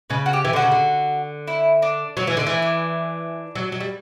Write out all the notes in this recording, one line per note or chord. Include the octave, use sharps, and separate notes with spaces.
C#3 B4
F#4
G4
E3
D3 F#4
C#3
D3
E4
D4
F#3 C#4
E3
D3 D4
E3
D4
F#3
F#3
G3